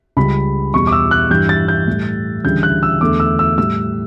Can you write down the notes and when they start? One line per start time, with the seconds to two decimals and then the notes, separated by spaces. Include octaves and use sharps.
0.17 C#2 C#3 G3 B5
0.73 E2 B2 G3 C#6
0.87 D6
0.92 E6
1.11 F#6
1.30 G2 E3 G3 G6
1.49 A6
1.68 G6
1.88 A2 G3
2.44 D2 C#3 E3 G3 G6
2.63 F#6
2.83 E6
3.01 E2 D3 A3 D6
3.20 E6
3.39 E6
3.58 A2 G3 E6